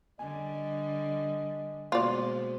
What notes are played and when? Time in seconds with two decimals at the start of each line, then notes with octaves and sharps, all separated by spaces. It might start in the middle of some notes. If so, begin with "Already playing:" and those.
0.19 D3 G3 D#5 G#5
1.92 B2 G#3 A#3 F4 F#4 C5 D5